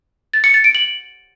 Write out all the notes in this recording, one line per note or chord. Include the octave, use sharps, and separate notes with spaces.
A6
C#7
A6
D7
F#7